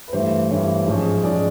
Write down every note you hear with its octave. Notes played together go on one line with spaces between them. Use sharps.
B4
G2 E3 A3 C5
G2 E3 A3 C#5
G#2 F3 G#3 C#4
G#2 F3 G#3 C#4 D5